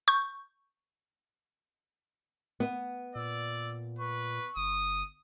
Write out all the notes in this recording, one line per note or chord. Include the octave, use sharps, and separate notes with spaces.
C#6 G6
B3
A#2 D5 E6
B4 C#6
G1 D#6